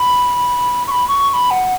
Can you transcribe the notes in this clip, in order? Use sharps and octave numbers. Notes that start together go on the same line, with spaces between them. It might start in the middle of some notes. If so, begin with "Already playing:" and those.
Already playing: B5
C#6
B5
C#6
C#6
B5
F#5